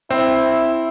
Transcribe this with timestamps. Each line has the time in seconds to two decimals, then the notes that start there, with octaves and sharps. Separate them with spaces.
0.11 C4 E4